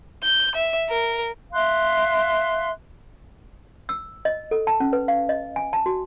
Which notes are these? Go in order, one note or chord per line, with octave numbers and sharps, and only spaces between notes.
G6
E5
A#4
E5 F5 C6 F#6
E6
D#5
A4
A5
C#4
B4
F5
D#5
G#5
A5
F#4